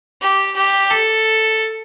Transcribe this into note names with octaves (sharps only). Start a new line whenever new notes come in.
G4
G4
A4